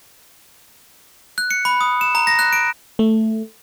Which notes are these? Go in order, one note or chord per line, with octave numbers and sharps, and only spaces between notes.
F#6
C#7
B5
D#6
E7
A#5
A#6
F#6
D7
A3